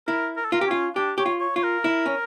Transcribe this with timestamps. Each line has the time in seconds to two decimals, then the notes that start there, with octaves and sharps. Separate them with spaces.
0.07 E4 A#4
0.37 A#4
0.45 A4
0.52 F4 A#4
0.61 G4
0.67 C#4 F4
0.96 D4 G4
1.18 G4 C#5
1.26 F4
1.40 C#5
1.56 F4 C#5
1.63 A#4
1.84 E4
2.06 C#4